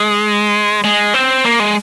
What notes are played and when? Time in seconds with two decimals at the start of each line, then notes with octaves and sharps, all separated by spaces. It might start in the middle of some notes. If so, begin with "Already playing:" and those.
Already playing: G#3
0.84 G#3
1.14 C4
1.44 A#3
1.60 G#3